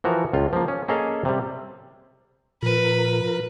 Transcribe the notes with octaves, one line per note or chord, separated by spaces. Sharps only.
E3 F3 F#4 A#4
C#2 F4
F3 A#3
C#4
A#3 C#4 G#4 A4 D#5 F5
C3 G3
A#2 F3 A#4 B4